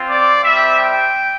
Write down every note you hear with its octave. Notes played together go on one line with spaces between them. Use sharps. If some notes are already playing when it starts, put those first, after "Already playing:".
Already playing: C4 F4
D5
G3 C4 G4 E5
G5